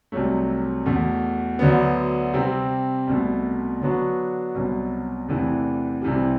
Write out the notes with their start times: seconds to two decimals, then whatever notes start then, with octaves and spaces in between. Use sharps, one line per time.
0.12 C2 C3 F#3 A3
0.86 E2 B2 A3
1.59 D2 D3 F#3 B3
2.34 C3 G3 C4
3.07 C2 B2 A3
3.81 D3 F#3 B3 D4 F#4
4.55 C2 B2 F#3
5.28 E2 C3 E3 A3 D4
6.02 C2 C3 E3 G3